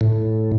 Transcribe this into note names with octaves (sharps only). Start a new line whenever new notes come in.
A2